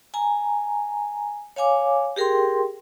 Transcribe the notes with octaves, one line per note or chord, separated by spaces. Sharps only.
G#5 A#5
C#5 F5 G#5 D6
G4 G#4 A#4 G5 C6